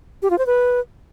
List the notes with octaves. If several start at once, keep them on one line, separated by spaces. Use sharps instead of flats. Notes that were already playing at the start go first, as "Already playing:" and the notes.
G4
F4
C5
B4